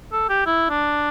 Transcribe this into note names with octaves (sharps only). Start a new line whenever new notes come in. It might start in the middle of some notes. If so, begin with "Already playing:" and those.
A4
G4
E4
D4